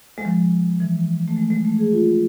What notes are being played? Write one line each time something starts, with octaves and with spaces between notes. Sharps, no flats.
G#3
F3
E3
A3
G#3
G#3
A3
G#4
F4